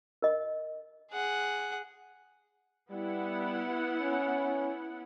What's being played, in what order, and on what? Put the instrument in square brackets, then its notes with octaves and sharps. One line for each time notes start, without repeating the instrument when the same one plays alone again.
[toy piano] A#4 D#5
[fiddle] G#4 F#5
[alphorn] G3 [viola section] B3 E4 F#5
[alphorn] C#4